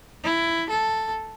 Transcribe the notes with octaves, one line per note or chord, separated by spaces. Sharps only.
E4
A4